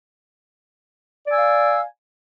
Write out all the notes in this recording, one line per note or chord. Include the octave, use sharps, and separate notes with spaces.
D5 F5 G#5 E6